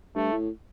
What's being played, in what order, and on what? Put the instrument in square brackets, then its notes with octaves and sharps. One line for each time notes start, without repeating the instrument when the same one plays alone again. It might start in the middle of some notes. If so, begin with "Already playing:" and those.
[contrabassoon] G2 [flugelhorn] A3
[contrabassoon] A2